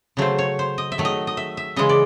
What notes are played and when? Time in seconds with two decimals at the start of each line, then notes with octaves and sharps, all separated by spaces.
0.17 C#3 F#3 A3 C5
0.38 C#5
0.59 C5
0.78 D#5
0.92 E5
0.98 D#3 F#3 A3
1.05 D#5
1.27 D#5
1.37 E5
1.57 E5
1.76 C#3 E3 G#3 D#5
1.89 D5